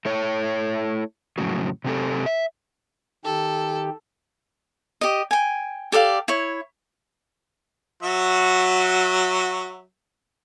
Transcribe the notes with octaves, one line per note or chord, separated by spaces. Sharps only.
A3 E4 C#5
F2 A2 C#3 F#3
C3 F#3 C4 G4 A4
E5
D#3 G4 A4
G4 D#5
G5 G#5
G4 A4 D5 F5
E4 C#5
F#3 F#4 E5